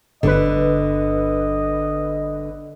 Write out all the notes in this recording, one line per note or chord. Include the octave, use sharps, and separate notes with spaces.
G1 D3 B4 D#5